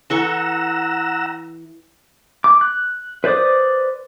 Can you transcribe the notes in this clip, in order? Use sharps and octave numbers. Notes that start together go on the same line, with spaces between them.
E3 A4 F#5 A#5 C#6 E6
D6
F#6
B4 C5 D5 D6 D#6